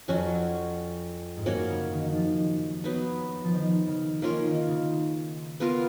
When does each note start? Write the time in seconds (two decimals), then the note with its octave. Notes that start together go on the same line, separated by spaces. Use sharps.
0.08 F2 F#3 C#4 F#4
1.37 G#2
1.46 F#2 A#3 C#4 F#4 C#5
1.69 C#3
1.92 D#3
2.04 D#3
2.14 F3
2.84 F#3 B3 D#4
3.44 F3
3.53 D#3
3.87 C#3
4.22 D#3 A#3 C#4 F4 A#4
4.45 D#3
4.68 C#3
5.60 B3 F4 A#4 F5